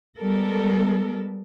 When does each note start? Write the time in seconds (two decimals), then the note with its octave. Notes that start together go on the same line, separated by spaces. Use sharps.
0.20 G3 G#3 B3 A4 A#4